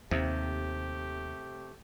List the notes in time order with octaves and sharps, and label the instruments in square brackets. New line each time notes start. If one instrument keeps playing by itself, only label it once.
[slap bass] D#2 [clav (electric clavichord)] C3 [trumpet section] A3 G4